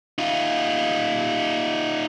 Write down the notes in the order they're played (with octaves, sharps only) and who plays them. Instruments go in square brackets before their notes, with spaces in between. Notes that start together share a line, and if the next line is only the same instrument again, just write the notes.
[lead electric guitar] D#4 F4